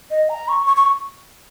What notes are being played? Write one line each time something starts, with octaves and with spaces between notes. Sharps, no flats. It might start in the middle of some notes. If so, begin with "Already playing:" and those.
D#5
A#5
C#6
C#6
C#6